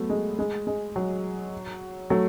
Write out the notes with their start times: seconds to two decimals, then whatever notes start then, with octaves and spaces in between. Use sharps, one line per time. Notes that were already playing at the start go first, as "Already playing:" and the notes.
Already playing: F#3 A3 B3
0.10 G#3
0.39 G#3
0.67 G#3
0.96 F#3
2.10 F#3 A3